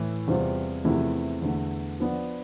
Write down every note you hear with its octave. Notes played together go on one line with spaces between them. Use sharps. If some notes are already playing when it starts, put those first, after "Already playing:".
Already playing: A2 E3
E2 C3 G3 C4 F4
E2 C3 F3 A3 E4
E2 D3 A3
F3 B3 D4